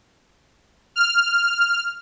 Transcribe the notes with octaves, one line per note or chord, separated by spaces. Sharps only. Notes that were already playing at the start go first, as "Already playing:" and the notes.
F6